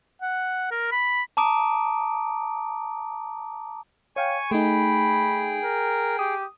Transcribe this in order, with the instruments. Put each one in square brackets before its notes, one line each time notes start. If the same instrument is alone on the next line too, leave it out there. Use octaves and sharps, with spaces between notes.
[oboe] F#5
A#4
B5
[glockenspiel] A5 A#5 D6 D#6 D7
[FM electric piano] C#5 F5 G5 [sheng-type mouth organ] G#5 C#6
[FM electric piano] A3 D#4 [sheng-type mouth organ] G#4 G5 [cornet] B5
[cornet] A#4
[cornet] G4 [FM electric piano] D#6